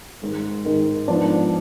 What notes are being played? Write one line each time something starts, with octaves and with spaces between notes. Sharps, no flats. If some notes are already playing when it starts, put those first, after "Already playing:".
G#2 D#3 G#3
G#2 D#3 G#3
G#2 F3 B3 D4